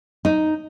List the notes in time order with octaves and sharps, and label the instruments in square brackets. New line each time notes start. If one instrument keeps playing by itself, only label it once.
[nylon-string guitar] D#4